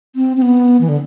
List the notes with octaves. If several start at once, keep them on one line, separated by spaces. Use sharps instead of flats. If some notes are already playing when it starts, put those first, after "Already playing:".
C4
C4
B3
E3
D3